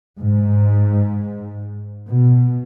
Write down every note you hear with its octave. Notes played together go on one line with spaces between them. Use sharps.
G#2
B2